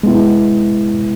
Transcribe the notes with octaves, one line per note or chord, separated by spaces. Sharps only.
G#3 B3 E4